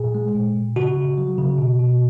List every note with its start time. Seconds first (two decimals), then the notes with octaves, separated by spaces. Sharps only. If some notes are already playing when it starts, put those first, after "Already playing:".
Already playing: A#2 G#4
0.15 G#3
0.35 A#2
0.55 A#2
0.76 C#3 F#4
0.97 C#3
1.18 F#3
1.38 C#3
1.58 B2
1.79 B2